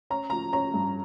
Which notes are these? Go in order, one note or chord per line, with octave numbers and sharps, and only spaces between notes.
C#4 A#5
F3 A#5
C#4 A#5
G2